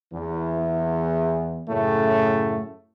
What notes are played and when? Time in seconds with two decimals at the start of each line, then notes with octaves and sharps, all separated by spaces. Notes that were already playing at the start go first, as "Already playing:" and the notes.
0.13 E2 E3
1.68 F#2 A2 C#3 A3